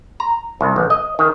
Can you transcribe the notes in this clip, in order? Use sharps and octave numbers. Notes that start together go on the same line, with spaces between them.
A#5
C2
A1
D#5
D#3